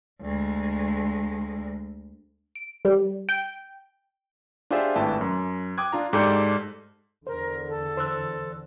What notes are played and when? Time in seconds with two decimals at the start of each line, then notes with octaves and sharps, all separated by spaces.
0.21 D2 G#3
2.55 D7
2.85 G3
3.29 G5
4.70 D4 F4 G4 G#4 C5 E5
4.96 G#1 A2 B4 E5 G5 A5
5.21 F#2
5.78 G5 D6 D#6 F#6 G#6
5.93 D4 F4 A#5
6.13 G#2 G4 A4 D5 G6 C#7
7.27 E2 D3 A#4 C5
7.69 A4
7.97 C5 E6 F#6